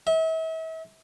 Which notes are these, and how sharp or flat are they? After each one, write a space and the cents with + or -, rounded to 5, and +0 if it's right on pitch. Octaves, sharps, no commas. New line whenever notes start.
E5 -40